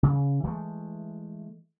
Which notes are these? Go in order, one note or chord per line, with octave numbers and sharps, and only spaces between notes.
C#3
E3 F#3 G#3 A3